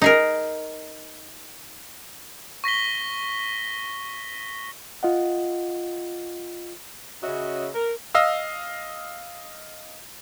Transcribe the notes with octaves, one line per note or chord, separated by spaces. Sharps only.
D#4 G#4 A#4
C#6 A#6 B6 G7
F4 D#5 F#5
C#3 C#4 F#4 D#5 E5
A#4
D#5 F5 E6